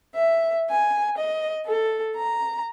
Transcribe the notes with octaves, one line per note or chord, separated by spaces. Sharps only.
E5
G#5
D#5
A4
A#5